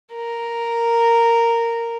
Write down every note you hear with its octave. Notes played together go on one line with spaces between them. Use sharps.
A#4